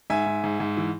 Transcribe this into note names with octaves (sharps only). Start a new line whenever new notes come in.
G#2 E5 G#5
G#2
G#2
G#2
E3